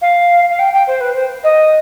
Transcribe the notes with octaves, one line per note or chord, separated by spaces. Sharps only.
F5
F5
G5
G5
C5
B4
C5
D#5